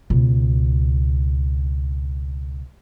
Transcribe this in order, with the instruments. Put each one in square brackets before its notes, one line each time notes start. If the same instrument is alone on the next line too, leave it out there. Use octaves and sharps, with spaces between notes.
[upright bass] C#2 B2